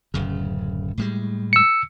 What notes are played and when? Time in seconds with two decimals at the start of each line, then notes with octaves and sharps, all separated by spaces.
0.14 D1 F#2 C#3
0.98 A2 G3 G#3
1.53 E6 C#7